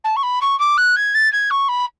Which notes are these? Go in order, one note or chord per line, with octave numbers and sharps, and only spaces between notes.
A5
C#6
B5
C#6
D6
F#6
G#6
A6
G#6
C#6
B5